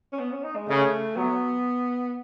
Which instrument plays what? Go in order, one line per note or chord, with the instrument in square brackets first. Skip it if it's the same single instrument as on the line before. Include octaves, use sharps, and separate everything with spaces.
[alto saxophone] C#4
B3
C#4
D#4
G#3
[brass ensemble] C#3 [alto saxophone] A3
[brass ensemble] F#3 [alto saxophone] B3